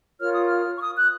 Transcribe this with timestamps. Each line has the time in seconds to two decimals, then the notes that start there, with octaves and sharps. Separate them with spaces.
0.20 F4 A#4 C#5 F6
0.33 D#6
0.45 F6
0.77 C#6
0.81 D#6
0.96 F#6